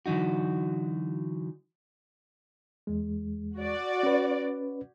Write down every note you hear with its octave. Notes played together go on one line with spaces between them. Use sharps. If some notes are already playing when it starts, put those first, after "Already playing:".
D3 E3 F#3 D#4 F#4
E2 G#3
F#4 D5
C#4 B4